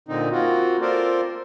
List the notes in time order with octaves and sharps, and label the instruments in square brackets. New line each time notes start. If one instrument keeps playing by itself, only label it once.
[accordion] A#2 D3 C4 D#4
A#3 C4 F4 F#4
C4 F4 A4 A#4 C5 D5